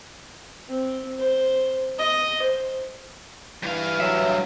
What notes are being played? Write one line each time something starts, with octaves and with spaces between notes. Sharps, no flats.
C4
C5
D#5
C5
G2 E3 F5
F#3 E5